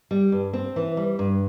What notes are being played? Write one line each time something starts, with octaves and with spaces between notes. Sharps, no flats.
G3
G2
C4
E3
G3
G2